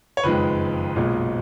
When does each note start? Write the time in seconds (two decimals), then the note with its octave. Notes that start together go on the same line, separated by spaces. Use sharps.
0.17 C#5
0.23 F#1 F2 D#3 G#3 B4
0.96 B1 A#2 G#3